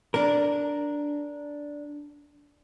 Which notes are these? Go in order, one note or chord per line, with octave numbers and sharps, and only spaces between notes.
D4 A#4